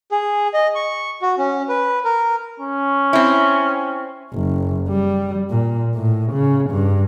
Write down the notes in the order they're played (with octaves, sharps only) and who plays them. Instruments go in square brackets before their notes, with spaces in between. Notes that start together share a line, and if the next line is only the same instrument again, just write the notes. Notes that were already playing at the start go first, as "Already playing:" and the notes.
[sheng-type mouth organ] G#4
D#5
C#6
F#4
C#4
B4
A#4
[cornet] C#4
[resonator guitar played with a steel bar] C4 E4
[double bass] F#1
G3
A#2
A2
C#3
G2